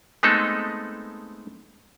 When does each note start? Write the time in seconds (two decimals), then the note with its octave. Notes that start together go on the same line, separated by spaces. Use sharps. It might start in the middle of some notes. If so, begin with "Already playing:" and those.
0.23 G#3 A3 B3 C4 D#4 A4